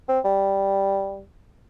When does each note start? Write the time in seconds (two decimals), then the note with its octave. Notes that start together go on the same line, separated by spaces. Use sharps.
0.09 C4
0.25 G3